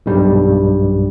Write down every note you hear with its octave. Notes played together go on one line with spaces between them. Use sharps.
B1 G2 G3